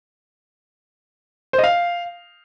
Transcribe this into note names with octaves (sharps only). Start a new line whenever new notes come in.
C5
D#5
F5